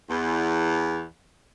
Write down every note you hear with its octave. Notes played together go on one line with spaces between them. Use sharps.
E2